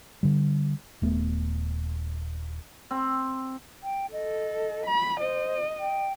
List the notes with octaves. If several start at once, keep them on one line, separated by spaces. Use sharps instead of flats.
D3 G3
D#1 A3 B3
C4
G5
A4 D#5
B5
C5 D#5
G5